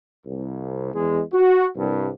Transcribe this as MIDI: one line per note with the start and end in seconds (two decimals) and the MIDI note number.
0.24 0.89 36
0.93 1.19 40
0.93 1.19 56
1.32 1.65 66
1.75 2.08 36
1.75 2.08 43